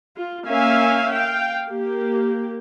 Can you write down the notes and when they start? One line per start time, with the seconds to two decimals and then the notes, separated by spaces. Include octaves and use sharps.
0.16 F4
0.46 A#3 C#4 E5 F5 G#5
1.13 F5 G5
1.68 A#3 G4